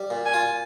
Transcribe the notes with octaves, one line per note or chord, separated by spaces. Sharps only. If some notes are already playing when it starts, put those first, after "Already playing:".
Already playing: G3
A#2
G#5
F4